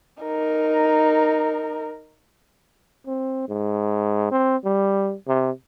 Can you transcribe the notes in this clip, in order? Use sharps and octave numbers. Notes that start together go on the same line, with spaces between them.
D#4 A#4
C4
G#2
C4
G3
C3